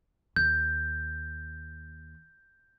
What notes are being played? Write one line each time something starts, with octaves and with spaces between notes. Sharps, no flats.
D#2 G6